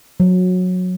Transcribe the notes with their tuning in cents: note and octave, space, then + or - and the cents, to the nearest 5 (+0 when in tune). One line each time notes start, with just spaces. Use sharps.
F#3 -20